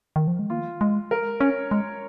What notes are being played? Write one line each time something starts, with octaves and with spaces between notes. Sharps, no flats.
D#3
F3
G#3
A#3 F4
G#3
A#4
C#4 C#5
G#3